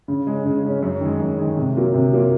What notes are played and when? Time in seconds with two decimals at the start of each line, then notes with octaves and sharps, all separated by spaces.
0.08 C#3
0.27 G#3 C#4
0.45 C#3
0.63 G#3 C#4
0.82 F#2
1.01 D#3 G#3
1.20 F#2
1.38 D#3 G#3
1.57 C3
1.76 F#3 A#3 F4
1.94 C3
2.13 F#3 A#3 F4